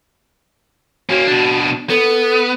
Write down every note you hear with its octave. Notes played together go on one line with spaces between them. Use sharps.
A#3 C#4 F#4
B2 D4
B3 A4